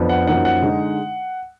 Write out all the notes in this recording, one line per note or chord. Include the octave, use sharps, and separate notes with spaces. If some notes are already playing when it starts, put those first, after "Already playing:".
Already playing: F2 F3 B3 D4
F#5
F#2 F3 A#3 D#4 F#5
F#5
D3 G#3 D#4